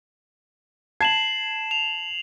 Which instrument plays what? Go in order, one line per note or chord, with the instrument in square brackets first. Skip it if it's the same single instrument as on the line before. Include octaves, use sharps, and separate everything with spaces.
[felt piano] A5 G#6 [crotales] C7 E7 F#7
[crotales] F7